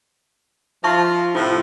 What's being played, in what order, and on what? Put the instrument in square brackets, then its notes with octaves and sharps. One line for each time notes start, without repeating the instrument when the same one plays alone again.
[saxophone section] F3 F4 [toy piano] E5 A5 C#6
[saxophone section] A2 C3 F3 [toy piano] F4